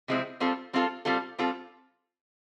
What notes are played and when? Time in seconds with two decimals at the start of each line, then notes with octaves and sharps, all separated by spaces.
0.08 C3 F3 G#3 C4 E4
0.40 G3 C4 F4 A4
0.73 G3 C4 F4 A4
1.05 G3 C4 F4 A4
1.39 G3 C4 F4 A4